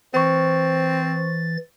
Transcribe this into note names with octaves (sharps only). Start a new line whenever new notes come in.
E3 C4 C5 C#6 A6